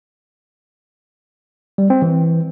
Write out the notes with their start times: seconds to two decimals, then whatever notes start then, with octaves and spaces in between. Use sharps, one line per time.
1.78 G3
1.90 C4
2.02 E3